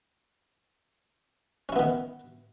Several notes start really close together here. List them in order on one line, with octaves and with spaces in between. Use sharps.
C#4 E4 B3 D#3